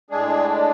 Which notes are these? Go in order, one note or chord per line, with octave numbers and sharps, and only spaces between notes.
A2 G#3 D4 G#4